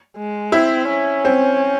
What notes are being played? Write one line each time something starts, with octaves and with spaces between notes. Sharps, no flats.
G#3
C4 E4
C#4
C4